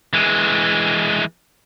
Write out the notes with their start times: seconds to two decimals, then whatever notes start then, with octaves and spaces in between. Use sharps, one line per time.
0.13 E3 G#3